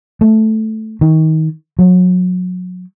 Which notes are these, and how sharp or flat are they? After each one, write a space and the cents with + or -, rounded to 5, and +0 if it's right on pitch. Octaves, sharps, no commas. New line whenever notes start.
A3 -5
D#3 +25
F#3 -30